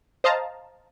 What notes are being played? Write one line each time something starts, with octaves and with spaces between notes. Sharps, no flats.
C5 D#5 F5 A5 A#5